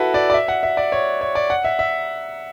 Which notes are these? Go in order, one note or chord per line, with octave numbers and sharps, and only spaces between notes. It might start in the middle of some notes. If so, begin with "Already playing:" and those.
Already playing: E4 F#4 A4 B4
D5
D5
E5
F#5
E5
D5
C#5
C#5
D5
F#5
E5
E5